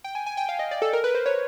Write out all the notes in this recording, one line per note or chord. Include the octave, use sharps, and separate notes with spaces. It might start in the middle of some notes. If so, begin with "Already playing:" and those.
G5
G#5
G#5
G5
F5
D#5
D5
A4
A#4
B4
C5
C#5